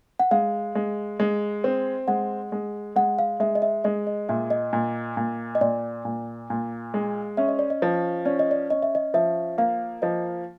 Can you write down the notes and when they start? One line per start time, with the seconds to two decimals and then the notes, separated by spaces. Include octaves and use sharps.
0.20 F#5
0.31 G#3 F5
0.75 G#3
1.20 G#3
1.64 C4
2.08 G#3 F#5
2.52 G#3
2.96 G#3 F#5
3.19 F5
3.40 G#3 E5
3.55 D#5
3.62 E5
3.84 G#3 D#5
4.07 D#5
4.29 A#2 E5
4.50 D#5
4.73 A#2
5.17 A#2
5.55 D#5
5.61 A#2 D5
6.05 A#2
6.50 A#2
6.94 G#3
7.37 C#4 E5
7.48 D#5
7.59 D5
7.70 D#5
7.82 F3
8.25 C#4 D5
8.39 D#5
8.51 D5
8.70 C#4 D#5
8.83 E5
8.95 D#5
9.14 F3 E5
9.58 A#3 F5
10.02 F3 D#5